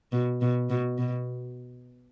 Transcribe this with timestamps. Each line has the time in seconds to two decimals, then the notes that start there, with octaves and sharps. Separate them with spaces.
0.12 B2
0.41 B2
0.70 B2
0.98 B2